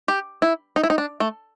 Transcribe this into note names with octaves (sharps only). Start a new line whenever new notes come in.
G4
E4
D#4
E4
D#4
D4
A3